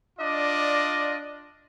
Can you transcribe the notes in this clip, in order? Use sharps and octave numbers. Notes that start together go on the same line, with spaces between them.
D4 F4 D5 D#5